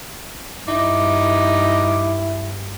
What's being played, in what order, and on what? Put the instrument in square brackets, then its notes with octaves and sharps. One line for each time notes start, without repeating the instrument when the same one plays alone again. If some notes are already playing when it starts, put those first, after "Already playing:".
[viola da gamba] G2 [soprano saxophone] D#4 [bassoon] E4 [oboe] D6